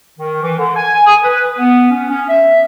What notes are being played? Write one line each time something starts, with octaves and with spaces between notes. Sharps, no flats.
D#3
E3
D3
G#5
D#6
B4
B3
C#4
C#4
E5